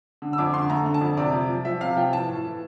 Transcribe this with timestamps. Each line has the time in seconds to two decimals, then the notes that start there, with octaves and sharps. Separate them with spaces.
0.22 D3
0.33 E6
0.38 F2 D6
0.54 D3 C6
0.70 A3 A#5
0.86 D3
0.94 A5
1.01 F2
1.17 C3 D5
1.33 F3
1.49 F3
1.65 F3 E5
1.80 C3 F5
1.97 F3 G5
2.12 E3 A5
2.29 A2
2.45 E3